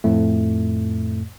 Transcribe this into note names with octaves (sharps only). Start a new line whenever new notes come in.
F2 A2 A3